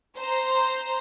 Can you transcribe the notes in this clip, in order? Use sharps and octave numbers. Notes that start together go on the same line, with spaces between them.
C5 A#5